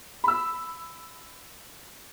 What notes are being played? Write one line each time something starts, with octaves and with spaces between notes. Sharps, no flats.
B5 E6